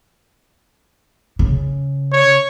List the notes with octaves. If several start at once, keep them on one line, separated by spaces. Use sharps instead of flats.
C#3
C#5